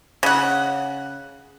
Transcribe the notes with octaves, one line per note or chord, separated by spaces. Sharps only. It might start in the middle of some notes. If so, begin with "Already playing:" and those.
C#3 F#5